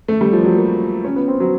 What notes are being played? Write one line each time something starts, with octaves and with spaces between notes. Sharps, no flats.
A3
G3
F3
F#3
A#3
C#4
B3
C4
F#3